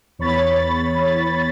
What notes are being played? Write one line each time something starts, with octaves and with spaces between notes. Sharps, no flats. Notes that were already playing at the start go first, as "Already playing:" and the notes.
E2 C#5 B5 A6